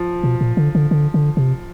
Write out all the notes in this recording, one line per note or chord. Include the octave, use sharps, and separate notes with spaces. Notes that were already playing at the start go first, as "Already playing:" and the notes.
Already playing: F3
B2
A#2
D3
D3
D3
D3
C3